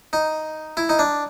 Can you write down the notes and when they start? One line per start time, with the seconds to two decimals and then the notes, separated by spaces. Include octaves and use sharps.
0.13 D#4
0.77 E4
0.89 D#4
0.99 D4